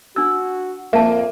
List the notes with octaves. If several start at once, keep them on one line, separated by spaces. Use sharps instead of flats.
D4 F#4 E6
F2 A#3 E5 A5